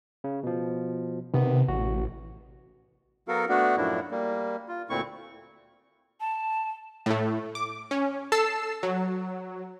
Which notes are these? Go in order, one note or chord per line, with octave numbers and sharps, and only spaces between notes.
C#3
B2 F3
C3 D#3 B3
A1 F#4
F#3 B3 F#4 A4 A#4 F5
A3 B3 D4 F#4
F#2 A2 F3 D4 E4
G3 A#3
F4
D2 A#2 A3 C4 E4 C#6
A5
A2 A3
D6
C#4
A4 A5 E6 C7 E7
F#3